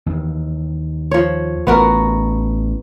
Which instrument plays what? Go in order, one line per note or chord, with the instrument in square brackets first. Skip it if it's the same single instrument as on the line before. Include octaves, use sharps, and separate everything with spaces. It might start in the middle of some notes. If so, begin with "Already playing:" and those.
[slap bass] D#2 E3
[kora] F3 C#5
[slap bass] A1 [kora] B3 F#4 A#4